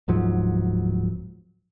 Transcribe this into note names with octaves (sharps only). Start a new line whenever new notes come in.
D1 G#2 F3 F#3